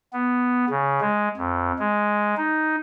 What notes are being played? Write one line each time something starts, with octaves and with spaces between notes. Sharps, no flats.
B3
C#3
G#3
F2
G#3
D#4